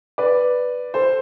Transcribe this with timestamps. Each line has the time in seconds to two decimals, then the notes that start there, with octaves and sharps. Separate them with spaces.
0.18 B4 D5
0.94 A4 C5